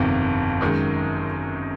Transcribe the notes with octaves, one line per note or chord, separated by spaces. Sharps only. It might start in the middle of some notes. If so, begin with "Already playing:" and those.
Already playing: G1 F2 C3 D#3
F#2 D#3 G#3